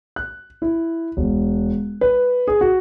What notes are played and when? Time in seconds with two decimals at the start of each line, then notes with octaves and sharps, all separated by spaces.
0.16 F#6
0.62 E4
1.17 E1
2.01 B4
2.48 G#4
2.61 F#4